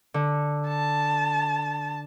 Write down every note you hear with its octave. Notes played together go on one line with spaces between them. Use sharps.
D3
A5